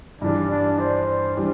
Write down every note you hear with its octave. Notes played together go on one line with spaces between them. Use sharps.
G2 E3 G3 D4
D4
C5
E3 G3 D4 G4